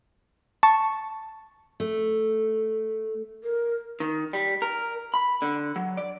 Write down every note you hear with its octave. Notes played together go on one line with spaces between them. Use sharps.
A5 C#6
A3
A#4
D#3
G3
A#4
B5
D3
F#3
D5